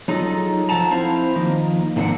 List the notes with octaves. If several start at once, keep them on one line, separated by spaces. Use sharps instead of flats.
F#3 D#4 F4 G#4 A4 D#5
F3 A4 F#5 A5 A#5
C4 E4 C5 F5
D#3 F3 A#3 D#4
G#2 D#3 A#3 C4 D4 F#5